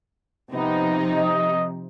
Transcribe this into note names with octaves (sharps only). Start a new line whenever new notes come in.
C3 F3 B3 D#4
D#5